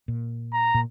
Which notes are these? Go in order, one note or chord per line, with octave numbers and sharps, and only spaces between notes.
A#2
A#5
A#2